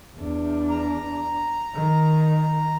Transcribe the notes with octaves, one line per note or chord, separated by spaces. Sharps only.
E2 D4
A#5
D#3